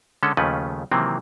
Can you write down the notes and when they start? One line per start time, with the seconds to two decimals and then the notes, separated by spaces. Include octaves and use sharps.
0.23 D3 G#3 C#4 A4
0.37 D#2 C#3 F3 A3 C#4 B4
0.91 C3 D#3 E3 F#3 A#3 C4